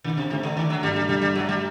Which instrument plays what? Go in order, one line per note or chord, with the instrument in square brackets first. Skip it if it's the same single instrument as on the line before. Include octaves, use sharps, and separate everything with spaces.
[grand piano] D3 [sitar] D#3
[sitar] C3
[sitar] C3 [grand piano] A3
[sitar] D3
[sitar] D#3 [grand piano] D4
[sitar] F#3
[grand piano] G2 [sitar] G3
[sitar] G3
[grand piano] D3 [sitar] G3
[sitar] G3
[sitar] F#3 [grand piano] A3
[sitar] G3